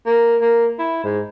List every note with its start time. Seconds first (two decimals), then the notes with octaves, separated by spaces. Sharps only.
0.06 A#3
0.41 A#3
0.79 E4
1.04 G#2